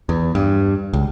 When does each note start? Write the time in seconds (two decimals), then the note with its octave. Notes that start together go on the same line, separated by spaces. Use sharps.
0.09 E2
0.35 G2
0.93 C#2